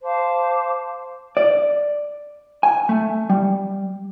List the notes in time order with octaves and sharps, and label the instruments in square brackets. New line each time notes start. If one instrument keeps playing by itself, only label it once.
[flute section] C5 F5 A5 D6
[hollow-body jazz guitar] D5
G#5
A3
G3